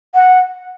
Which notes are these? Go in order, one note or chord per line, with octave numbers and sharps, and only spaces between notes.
F#5